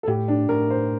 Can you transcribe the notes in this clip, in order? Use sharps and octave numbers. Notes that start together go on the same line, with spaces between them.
A4
A2 G4
D4
A2 A#4
C5